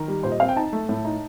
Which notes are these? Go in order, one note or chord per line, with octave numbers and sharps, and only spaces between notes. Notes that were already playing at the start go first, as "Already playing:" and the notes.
Already playing: D#3 A#4
G3
A#2 C5
D#5
C4 F5
G5
D#4 A5
A3
A2
D#4